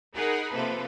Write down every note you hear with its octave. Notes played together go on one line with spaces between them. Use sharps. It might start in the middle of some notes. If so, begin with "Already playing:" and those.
D#4 G#4 A#4 F#5 B5
C3 F3 A#3 A4 B4